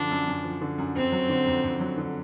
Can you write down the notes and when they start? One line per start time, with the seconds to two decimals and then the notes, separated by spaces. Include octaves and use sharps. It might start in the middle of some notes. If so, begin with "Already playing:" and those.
Already playing: F#2 D3 F3 D4
0.11 F#2
0.28 F#2
0.44 F3
0.61 D3
0.78 F#2
0.96 F2 C4
1.12 F#3
1.29 D3
1.47 F2
1.64 F2
1.80 F#3
1.98 D3